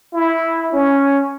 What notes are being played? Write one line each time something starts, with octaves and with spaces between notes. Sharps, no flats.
E4
C#4